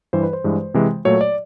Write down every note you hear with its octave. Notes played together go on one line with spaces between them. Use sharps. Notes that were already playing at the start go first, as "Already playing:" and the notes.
G2 E3 G3 C5
B4
C5
G2 E3 G#3
C3 E3 G#3
A#2 F#3 A3 C#5
D5